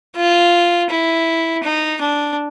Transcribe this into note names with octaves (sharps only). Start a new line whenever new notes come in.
F4
E4
D#4
D4